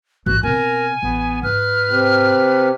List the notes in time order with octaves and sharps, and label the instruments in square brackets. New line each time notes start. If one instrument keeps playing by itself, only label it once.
[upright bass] A1 G#2 [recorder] F#4 [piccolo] F#6
[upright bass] B2 C4 [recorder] A#4 [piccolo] G#5
[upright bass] A1 [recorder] B3
[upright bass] G#2 [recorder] B4 [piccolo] F6
[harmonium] C3